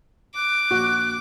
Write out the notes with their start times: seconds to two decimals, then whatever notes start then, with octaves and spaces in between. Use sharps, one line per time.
0.35 D6 F#6
0.71 A#1 F#4